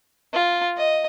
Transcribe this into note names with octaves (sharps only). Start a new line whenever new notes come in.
F4
D#5